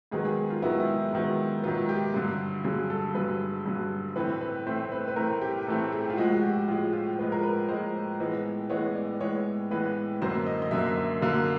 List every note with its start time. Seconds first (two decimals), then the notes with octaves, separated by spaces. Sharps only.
0.11 G#2 D#3 F#3 B3 G#4
0.25 G#4
0.50 F4
0.62 G#2 D#3 F#3 B3 E4
0.80 E4
1.13 G#2 D#3 F#3 B3
1.63 G#2 D#3 F#3 B3 F4
1.89 G4
2.14 G2 D3 F#3
2.64 G2 D3 F#3 G#4
2.90 A4
3.14 G2 D3 F#3 B4
3.66 G2 D3 F#3
4.16 A2 E3 A3 C4 B4
4.41 B4
4.66 A2 E3 A3 C4 C5
4.92 B4
5.08 B4
5.16 A2 E3 A3 C4 A#4
5.42 G4
5.67 A2 E3 A3 C4 A4
5.92 G#4
6.10 F4
6.17 A2 F3 G#3 F#4
6.35 F#4
6.43 G4
6.68 A2 F3 G#3 F4
6.93 F4
7.19 A2 F3 G#3 B4
7.32 A#4
7.43 B4
7.68 A2 F3 G#3 C5
8.20 A2 E3 G#3 B3
8.70 A2 E3 G#3 B3 C#5
8.95 D5
9.20 A2 E3 G#3 B3 C#5
9.71 A2 E3 G#3 B3 B4
10.21 F#2 D3 F#3 A#3 C5
10.46 D#5
10.62 D#5
10.71 F#2 D3 F#3 A#3 E5
10.97 E5
11.22 F#2 D3 F#3 A#3 F5